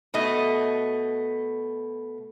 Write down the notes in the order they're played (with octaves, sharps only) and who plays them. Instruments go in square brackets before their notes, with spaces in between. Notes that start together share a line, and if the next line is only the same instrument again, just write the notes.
[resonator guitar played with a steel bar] B2 A3 D#5